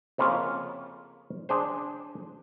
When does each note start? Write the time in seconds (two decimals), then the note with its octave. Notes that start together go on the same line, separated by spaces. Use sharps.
0.18 F2 C#3 A#3 F4
1.49 D4 G#4 C5